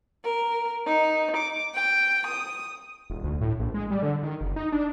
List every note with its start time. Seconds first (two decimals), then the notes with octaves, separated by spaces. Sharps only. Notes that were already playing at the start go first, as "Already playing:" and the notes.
0.24 A#4
0.86 D#4
1.36 D6
1.74 G5
2.26 D#6
3.10 D#1
3.24 D2
3.41 A2
3.59 A#1
3.74 G#3
3.91 G3
4.03 D3
4.23 D#3
4.41 F#1
4.56 D#4
4.72 D4